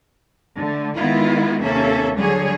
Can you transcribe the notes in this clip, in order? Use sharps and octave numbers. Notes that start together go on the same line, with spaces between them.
D3 A3
D#3 G#3 B3 E4 F4
D#2 C3 A#3 C#4 A4 E5
D3 F#3 G3 G#4 C#5